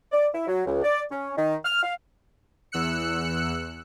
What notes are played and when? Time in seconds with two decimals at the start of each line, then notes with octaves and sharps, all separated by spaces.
0.12 D5
0.33 E4
0.46 F#3
0.66 C#2
0.83 D5
1.10 C#4
1.37 D#3
1.65 F6
1.83 F5
2.72 E2 E6 F#6 C#7